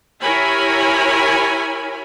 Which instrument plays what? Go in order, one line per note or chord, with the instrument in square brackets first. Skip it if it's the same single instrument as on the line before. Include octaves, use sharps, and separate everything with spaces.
[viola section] E4 G4 A#4 C#5 G#5 B5